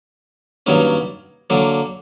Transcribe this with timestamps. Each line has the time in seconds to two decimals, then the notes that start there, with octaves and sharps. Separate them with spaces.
0.66 G2 D#3 F#3 A#3 C#4
1.50 D3 F#3 A#3